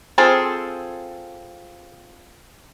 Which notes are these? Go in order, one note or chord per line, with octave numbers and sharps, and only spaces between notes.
C4 F4 G#4 A4